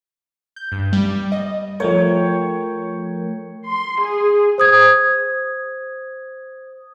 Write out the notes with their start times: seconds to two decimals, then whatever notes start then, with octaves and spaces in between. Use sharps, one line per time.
0.56 G6
0.72 G2
0.93 G3
1.32 D#5
1.80 F3 A3 A#4 C#5 G5
3.68 C6
4.02 G#4
4.58 C5 D#6 G#6